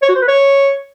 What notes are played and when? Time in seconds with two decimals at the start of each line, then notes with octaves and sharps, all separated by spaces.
0.02 C#5
0.09 F#4
0.15 C5
0.22 B4
0.28 C#5